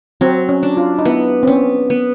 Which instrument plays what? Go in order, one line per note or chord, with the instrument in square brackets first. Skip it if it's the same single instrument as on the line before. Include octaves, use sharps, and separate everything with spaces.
[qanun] F#3 [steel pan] C4
[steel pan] C#4
[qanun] D4
[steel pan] F4
D#4
[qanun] B3 [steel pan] E4
[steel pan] C4
[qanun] B3 [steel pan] C#4
[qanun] B3